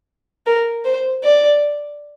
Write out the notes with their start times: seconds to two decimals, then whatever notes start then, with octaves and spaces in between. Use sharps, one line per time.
0.46 A#4
0.84 C5
1.23 D5